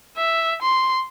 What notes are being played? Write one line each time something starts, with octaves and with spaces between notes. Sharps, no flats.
E5
C6